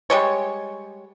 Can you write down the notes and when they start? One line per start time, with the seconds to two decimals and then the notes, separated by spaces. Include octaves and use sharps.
0.10 G3 G#3 C#5